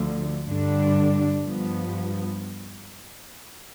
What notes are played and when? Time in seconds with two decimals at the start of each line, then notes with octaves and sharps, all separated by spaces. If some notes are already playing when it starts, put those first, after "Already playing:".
Already playing: D2 D3 F3
0.46 G2 D3 G3 D4
1.45 G2 F3 B3